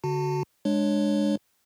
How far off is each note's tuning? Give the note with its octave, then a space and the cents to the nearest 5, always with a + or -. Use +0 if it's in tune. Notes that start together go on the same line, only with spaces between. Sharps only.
D3 -30 F#4 +0 A5 +25
G#3 +0 D4 +10 C#5 +0